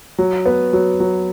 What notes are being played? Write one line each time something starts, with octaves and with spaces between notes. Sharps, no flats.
F#3
B3
F#3
F#3